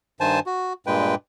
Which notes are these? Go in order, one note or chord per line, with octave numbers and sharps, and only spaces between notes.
G2 D#3 C5 G#5 A5
F#4
G2 A#2 G#3 B4 G5